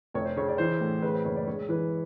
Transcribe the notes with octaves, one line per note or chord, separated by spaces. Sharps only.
F1 C#5
C5
C#3 C#5
D5
E3 C5
A2
C#3 B4
C5
F#1 C#5
D5
G#3 C#5
E3 B4